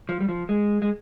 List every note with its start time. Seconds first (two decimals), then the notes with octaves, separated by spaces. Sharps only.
0.09 F3
0.21 G3
0.29 F3
0.49 G#3
0.82 G#3